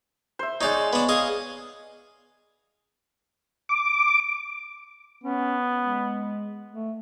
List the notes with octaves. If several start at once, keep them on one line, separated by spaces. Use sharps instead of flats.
C5 E5
G#3 D#4 C#5 D5
B3 D4
G#4 D#5 F5
D6
B3 C#4
G#3
A3